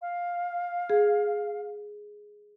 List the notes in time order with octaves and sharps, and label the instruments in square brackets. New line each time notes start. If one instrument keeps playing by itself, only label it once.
[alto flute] F5
[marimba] G#4